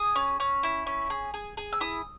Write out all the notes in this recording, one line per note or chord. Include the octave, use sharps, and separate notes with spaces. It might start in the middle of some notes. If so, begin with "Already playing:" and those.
Already playing: G#4 D#6
C#4
C#4
E4
C#4
G#4
G#4
G#4
E6
E4 D#6